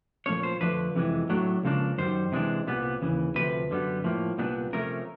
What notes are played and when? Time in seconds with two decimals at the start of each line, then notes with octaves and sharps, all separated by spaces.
0.26 A#2 F3 A3 C#4 C#5
0.43 C5
0.60 F2 D3 F3 A3 D4 B4
0.95 F2 C3 E3 G#3
1.29 A2 F#3 A3 D4
1.63 C#2 C#3 F3 A#3 D4
1.98 F#2 D#3 G3 C5
2.32 C3 E3 G#3 B3 D4
2.67 C2 A#2 G3 B3
3.01 D#2 C#3 E3
3.35 D2 C3 F3 B4
3.70 F#2 D3 G3 B3
4.04 A2 F3 A#3
4.38 C2 A#2 G3 B3 D4
4.73 C3 F3 A3 C#4 A#4